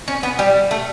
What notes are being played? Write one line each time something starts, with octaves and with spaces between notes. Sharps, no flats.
C#4
B3
G3
A3